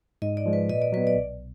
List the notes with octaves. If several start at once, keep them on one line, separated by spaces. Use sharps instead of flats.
G#2 D#5
D5
F3 G#3
B4
A#2 D#5
D5
F#3 B3 B4
D5
B1